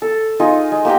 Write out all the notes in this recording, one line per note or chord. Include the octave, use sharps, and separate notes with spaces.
A4
D#4 F4 G#4
G#3
A#3 G4 F#5 G5